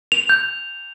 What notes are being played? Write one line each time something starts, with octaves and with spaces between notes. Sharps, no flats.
F7
G6